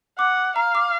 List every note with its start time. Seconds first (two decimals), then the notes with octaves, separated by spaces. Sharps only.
0.18 F#5 D6
0.37 D6
0.56 F5 A#5
0.75 D6